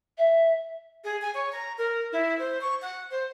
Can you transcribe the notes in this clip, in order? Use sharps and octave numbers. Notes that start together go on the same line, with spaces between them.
E5
G#4
G#5
C#5
A#5
A#4
E4
C5
C#6
F#5
C5